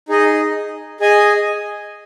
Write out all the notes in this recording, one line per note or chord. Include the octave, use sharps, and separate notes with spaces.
D#4 G#4 D#5
G#4 D#5 G#5